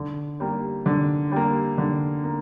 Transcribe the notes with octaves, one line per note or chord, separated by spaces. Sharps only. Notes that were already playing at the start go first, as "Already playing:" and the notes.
Already playing: D3
G3 A#3
D3
G3 A#3
D3
A#3